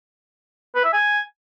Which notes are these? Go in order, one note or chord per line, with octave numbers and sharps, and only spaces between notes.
B4
E5
G#5